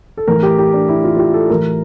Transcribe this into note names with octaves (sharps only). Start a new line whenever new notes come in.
A4
A2 E3 A#4
G4
G4
D4
E4
F4
F4
G4
A4
A2 E3 A#4